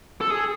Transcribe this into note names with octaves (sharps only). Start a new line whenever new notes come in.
A4
G#4